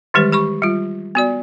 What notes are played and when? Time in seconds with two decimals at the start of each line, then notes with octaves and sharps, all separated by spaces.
0.14 D#3 E3 G3 G#3 G4 B4
0.32 G4 B5 C#6
0.62 G3 F4
1.15 B3 F#4 D5